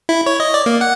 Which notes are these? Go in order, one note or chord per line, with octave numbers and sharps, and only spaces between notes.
E4
C#5
D#5
D5
A#3
F#5